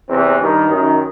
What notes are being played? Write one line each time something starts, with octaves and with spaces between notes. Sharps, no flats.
E2 C3 E3 C4
G2 D#3
F#2 D#3